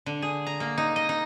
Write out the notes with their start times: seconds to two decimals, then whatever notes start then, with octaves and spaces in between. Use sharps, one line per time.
0.06 D3
0.22 G#4
0.47 A#5
0.60 A#3
0.78 D#4
0.96 D#5
1.09 D#4